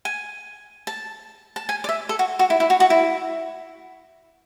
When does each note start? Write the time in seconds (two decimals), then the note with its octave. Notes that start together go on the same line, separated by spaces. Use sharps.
0.05 G#5
0.87 A5
1.56 A5
1.69 G#5
1.84 D5
1.89 E5
2.09 A4
2.19 F#4
2.39 F#4
2.50 E4
2.60 E4
2.70 F#4
2.80 F#4
2.90 E4